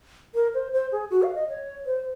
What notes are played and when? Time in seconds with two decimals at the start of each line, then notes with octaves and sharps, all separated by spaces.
0.34 A#4
0.54 C5
0.73 C5
0.92 G#4
1.11 F#4
1.23 F5
1.35 D#5
1.49 C#5
1.86 C5